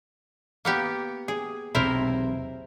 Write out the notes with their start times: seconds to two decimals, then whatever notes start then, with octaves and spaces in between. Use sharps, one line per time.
0.65 A#3 B3 G4
1.28 G#4
1.75 E1 B1 C3 E4 A#4 C5